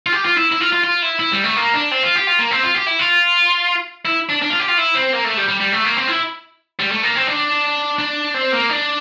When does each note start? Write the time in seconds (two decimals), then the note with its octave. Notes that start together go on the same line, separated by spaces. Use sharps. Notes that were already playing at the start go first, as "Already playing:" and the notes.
0.06 F4
0.13 G4
0.25 F4
0.37 E4
0.51 E4
0.60 F4
0.72 F4
0.84 F4
1.02 E4
1.19 E4
1.32 G3
1.44 A3
1.56 A#3
1.74 D4
1.91 C4
2.03 F4
2.16 G4
2.27 F4
2.39 A#3
2.51 C4
2.63 F4
2.74 G4
2.86 E4
2.99 F4
4.05 E4
4.29 D4
4.42 D4
4.50 F4
4.59 G4
4.68 F4
4.78 E4
4.95 C4
5.13 A#3
5.25 A3
5.37 G3
5.48 G3
5.60 G3
5.72 A3
5.84 A#3
5.97 C4
6.07 E4
6.79 G3
6.91 A3
7.03 A#3
7.16 C4
7.27 D4
7.98 D4
8.34 C4
8.52 A#3
8.70 D4